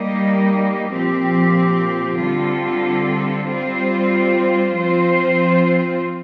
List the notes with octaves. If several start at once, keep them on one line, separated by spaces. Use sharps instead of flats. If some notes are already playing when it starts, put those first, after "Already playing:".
Already playing: G3 A#3 D#4
A#2 F3 C4 G4
D3 G3 C4 F4 A4
G3 C4 F4 C5
F3 C4 F4 C5